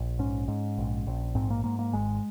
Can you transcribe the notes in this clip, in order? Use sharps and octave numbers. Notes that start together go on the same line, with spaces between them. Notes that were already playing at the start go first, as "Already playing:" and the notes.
Already playing: A#1
G#2 C#4
G#2
A#1
A#1
G#2 C4
A#3
G#2 A#3
A#3
G#1 G#3